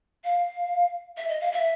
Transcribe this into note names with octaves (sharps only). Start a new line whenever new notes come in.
F5
E5
D#5
F5
E5